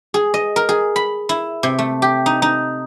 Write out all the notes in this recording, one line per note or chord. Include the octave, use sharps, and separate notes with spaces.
G#4
D#5
A#4
G#4
B5
E4
C3
A3
G4
D#4
D#4